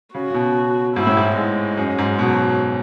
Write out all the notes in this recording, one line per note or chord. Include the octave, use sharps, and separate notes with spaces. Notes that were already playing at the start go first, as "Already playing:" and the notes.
C#3 F#4
C#3
B2
G#2 E4
A2
G#2
G#3
F#2
G#2
B2 F#3